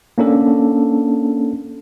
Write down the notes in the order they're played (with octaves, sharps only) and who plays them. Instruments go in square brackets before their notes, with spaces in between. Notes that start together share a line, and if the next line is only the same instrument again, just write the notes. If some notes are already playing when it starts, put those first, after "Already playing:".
[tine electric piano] A#3 C#4 D4 A4